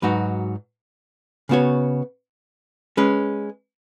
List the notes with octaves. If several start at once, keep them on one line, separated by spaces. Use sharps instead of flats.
G#2 F#3 D#4 F#4 B4
C#3 B3 F#4 C#5
G#3 C#4 B4